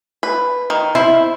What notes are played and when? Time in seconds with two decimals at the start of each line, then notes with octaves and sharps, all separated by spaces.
0.23 B4
0.70 D#3
0.95 E4 C5